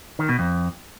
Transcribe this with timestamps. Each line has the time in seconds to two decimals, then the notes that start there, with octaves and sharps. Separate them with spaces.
0.19 D#3
0.29 B2
0.39 F2